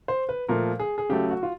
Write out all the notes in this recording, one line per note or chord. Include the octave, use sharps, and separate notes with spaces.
C5
B4
A#2 F3 A3 A#4
G#4
G#4
C#3 F#3 A3 G4
F#4
F4